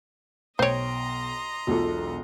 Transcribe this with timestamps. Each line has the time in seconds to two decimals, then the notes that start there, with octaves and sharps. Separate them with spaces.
0.59 B1 C5 C#5 D#5 G5 A#5 C6 D7
1.67 E1 B1 F4 F#4 A4